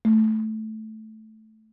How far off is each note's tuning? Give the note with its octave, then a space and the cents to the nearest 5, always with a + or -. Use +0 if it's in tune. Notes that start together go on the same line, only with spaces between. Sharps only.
A3 -10